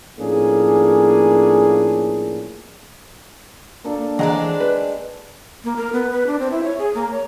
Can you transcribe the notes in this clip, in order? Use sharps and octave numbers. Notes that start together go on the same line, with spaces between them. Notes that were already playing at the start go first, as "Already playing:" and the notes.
A2 F3 A#3 C#4 D4 G#4
A#3 D4 A4
E3 G#3 C4 D4 A4 C#5 F#5 A#5
B4
A#3
A#4
B3
B4
D4
C4
E4
C#5
G#4
A#3
C#5